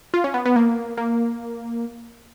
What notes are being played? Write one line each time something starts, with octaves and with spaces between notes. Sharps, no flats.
F4
C#4
B3
B3
A#3
A#3